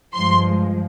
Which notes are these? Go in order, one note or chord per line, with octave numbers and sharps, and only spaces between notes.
G2 F3 G#3 C6